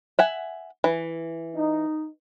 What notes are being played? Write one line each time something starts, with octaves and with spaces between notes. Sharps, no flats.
E5 F#5 G#5
E3
D#4